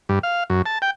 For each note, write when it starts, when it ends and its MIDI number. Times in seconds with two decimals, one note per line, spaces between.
0.09 0.19 43
0.23 0.44 77
0.50 0.62 42
0.66 0.78 81
0.82 0.91 79